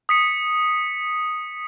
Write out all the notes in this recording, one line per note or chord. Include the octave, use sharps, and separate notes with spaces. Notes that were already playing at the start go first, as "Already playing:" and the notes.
D#6 B6 C#7